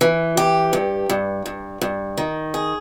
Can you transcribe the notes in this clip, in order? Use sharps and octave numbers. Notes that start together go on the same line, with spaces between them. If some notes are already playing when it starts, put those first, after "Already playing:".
E3
G4
G2
G2
G2
G2
D#3
G#4